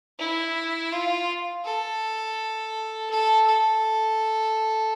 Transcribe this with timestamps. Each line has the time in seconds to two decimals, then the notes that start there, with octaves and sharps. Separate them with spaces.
0.19 E4
0.92 F4
1.65 A4
3.10 A4
3.47 A4